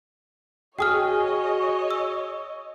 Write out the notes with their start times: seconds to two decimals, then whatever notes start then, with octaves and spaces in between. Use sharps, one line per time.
0.79 F#4 G#4 C#5 D#5 G5 G#5 D#6 F6
1.91 E6